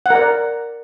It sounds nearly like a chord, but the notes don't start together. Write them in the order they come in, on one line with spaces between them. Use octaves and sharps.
F#5 A#4 D5